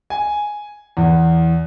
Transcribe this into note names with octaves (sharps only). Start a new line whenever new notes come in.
G#5
E2